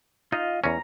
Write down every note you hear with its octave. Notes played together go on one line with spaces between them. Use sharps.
D#4 F4 D#5 F5
E2 C#4 A#5